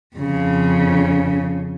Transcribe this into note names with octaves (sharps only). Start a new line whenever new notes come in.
F2 C#3